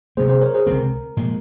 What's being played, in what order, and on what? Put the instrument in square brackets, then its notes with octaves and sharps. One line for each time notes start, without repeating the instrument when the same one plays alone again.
[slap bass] C3 F#3 A#3 [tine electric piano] G#4 C5
[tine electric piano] G#4 C5
A#4 C#5
G#4 C5
[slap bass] F#3 C4 [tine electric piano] A#4
[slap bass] C#2 C3
A#2 F3 G#3